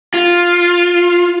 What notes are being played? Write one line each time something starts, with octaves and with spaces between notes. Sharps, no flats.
F4